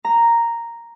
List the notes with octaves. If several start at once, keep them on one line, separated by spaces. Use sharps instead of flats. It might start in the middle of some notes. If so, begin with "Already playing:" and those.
A#5